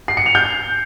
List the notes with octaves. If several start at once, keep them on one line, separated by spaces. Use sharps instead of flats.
C7
C#7
F7
G6